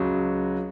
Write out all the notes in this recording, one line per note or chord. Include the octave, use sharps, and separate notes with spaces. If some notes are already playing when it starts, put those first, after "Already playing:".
Already playing: C#2 C#3 F#3